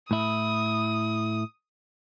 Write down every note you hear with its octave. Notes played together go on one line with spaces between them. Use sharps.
A2 E4 D#6